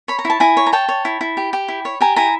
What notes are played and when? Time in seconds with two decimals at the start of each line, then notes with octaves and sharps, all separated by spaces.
0.08 C#5 B5
0.19 A#5
0.25 E4 A5
0.40 E4 G#5 A#5
0.57 C#5
0.67 A#5
0.73 C#5 G5 A5
0.88 C#5
1.05 E4
1.21 E4
1.37 G4
1.53 G4
1.68 E4
1.85 C#5
2.01 G4 G#5 A#5
2.16 E4 G#5 A#5